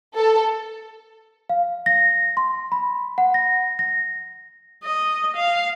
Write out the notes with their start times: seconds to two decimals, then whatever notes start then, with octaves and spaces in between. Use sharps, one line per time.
0.15 A4
1.49 F5
1.86 A#6
2.37 C6
2.72 B5
3.18 F#5
3.34 A#6
3.79 A#6
4.84 D#5
5.37 F5